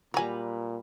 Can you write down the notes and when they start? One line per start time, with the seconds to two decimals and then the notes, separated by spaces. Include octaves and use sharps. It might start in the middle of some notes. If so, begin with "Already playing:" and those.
0.14 A#2 F#3 G3 B4 G#5 A#5